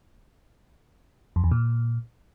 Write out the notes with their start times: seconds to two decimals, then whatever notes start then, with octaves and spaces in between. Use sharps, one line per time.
1.36 F2
1.44 E2
1.51 A#2